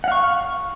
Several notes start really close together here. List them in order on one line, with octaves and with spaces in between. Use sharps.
F#5 F5 C#6